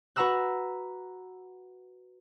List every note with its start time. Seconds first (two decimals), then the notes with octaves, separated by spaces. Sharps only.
0.16 F#4 B4 F#5 A#5 E6 F#6